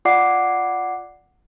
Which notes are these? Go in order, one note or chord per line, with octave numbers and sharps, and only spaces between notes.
F4 D5 F#5 D6 C7